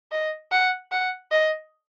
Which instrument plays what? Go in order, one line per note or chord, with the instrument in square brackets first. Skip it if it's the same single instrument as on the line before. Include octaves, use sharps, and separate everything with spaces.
[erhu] D#5
F#5
F#5
D#5